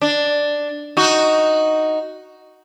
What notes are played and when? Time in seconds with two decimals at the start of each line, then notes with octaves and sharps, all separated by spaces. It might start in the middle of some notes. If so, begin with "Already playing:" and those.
0.02 D4
0.97 D#4 F#4